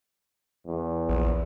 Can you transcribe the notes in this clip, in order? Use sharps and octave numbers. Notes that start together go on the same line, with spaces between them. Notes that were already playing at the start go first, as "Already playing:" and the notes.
E2
A#1